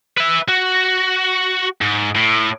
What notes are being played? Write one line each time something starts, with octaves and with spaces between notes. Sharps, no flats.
B4 E5
F#4
G#2
A2